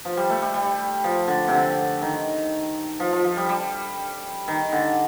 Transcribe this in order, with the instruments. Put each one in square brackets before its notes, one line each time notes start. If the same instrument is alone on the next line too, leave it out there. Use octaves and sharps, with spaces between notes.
[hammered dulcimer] F3
G3
A3
G3
G3
F3
D3
C3
D3
D#3
F3
F3
F3
G3
G3
D#3
D3